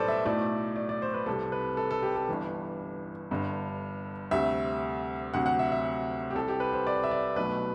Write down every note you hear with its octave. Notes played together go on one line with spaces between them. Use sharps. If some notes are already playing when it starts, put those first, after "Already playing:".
Already playing: B1 A2 G3 A4 B4 C5 D5
E5
B1 A2 F#3 A3 D5
D5
D5
C5
B4
C2 C3 G3 A4
B4
A4
A4
G4
A4
G1 G2 E3
G1 G2 D3
D2 C3 G3 E5
D2 C3 F#3 F#5
F#5
E5
E5
G4
C2 C3 G3 A4
G4
B4
C5
D5
E5
D5
B1 B2 F#3 A3 B4